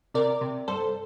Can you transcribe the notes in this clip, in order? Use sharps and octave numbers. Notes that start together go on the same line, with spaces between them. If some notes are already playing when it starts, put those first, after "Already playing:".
C3 A#4 D5
C3
G2 A4 C5